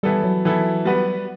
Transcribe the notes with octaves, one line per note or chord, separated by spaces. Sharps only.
E3 G3 B3 E4 A4
F#3
E3 B3 E4 A4
G3 B3 F#4 B4